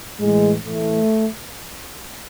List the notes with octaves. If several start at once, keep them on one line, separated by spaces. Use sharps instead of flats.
A2 E3 G#3
A2 E3 A3